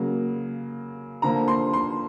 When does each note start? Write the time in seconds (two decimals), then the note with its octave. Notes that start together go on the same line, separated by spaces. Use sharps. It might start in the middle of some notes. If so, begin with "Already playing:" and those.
Already playing: C#3 F#3 A#3
1.22 D3 F3 A#3 A#5
1.48 C6
1.73 C6